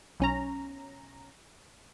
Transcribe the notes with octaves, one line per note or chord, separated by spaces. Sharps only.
B1 C#4 A#5